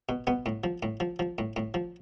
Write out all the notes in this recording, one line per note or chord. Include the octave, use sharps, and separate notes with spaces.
B2
B2 B3
A2
F3
A2
F3
F3
A2
A2
F3